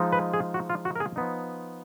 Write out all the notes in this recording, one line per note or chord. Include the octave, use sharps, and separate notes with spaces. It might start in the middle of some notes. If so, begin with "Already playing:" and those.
Already playing: F3 G#3 D#4
B4
G#4
F#4
F4
F#4
A#4
G#4
F3 B3 D#4